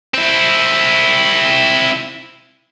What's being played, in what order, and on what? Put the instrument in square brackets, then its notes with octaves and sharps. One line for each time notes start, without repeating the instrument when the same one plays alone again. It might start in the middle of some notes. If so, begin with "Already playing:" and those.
[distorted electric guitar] C4 E4